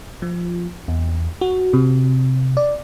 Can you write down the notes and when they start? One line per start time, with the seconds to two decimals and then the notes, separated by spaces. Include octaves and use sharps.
0.22 F3
0.88 E2
1.41 F#4
1.73 C3
2.57 D5